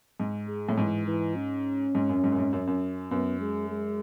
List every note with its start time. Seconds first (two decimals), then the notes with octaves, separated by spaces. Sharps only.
0.20 G#2
0.48 G#3
0.69 A2
0.78 G#2 E3
1.07 E3
1.36 C#4
1.95 G#2
2.09 F#2
2.24 G#2
2.32 F#2
2.39 G#2
2.53 F#2
2.67 F#2
3.11 F#2 B3
3.41 G#3
3.71 G#3